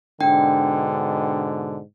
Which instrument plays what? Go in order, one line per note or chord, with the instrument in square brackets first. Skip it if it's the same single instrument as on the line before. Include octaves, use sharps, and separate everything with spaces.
[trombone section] G#2 B2 D3 [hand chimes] D4 G5